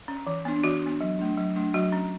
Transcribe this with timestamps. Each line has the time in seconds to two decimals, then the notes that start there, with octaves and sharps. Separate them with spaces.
0.08 C#4
0.27 E3
0.45 B3 D4
0.63 E3 F#4
0.82 B3 D4
1.01 F#3
1.19 A3 D4
1.37 F#3
1.56 A3 D4
1.74 F#3 F#4
1.92 C#4